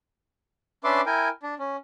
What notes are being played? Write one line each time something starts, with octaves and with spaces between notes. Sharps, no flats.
C#4 D4 B4 E5 C6 D6
E4 A#4 G5 G#5
D4
C#4